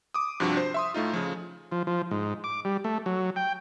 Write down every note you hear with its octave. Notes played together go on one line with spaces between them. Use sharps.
D6 D#6
G2 C3 F3 D4 F#4 G4
C5
E5 C6 D#6
A2 A3 D#4 F4
C#3 F3
F3
F3
G#2
D6
G3
A3
F#3
G5